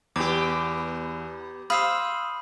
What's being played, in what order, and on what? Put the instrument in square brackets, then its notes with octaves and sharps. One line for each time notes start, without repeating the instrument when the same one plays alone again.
[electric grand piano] E2 [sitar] B3 G4 [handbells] D6
[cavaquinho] C5 F5 [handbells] B5 E6 [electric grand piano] D#6